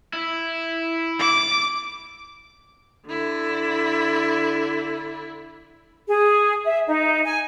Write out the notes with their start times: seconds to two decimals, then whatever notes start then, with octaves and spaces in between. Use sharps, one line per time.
0.13 E4
1.19 D6
3.06 D3 E4
6.08 G#4
6.65 E5
6.87 D#4
7.24 G#5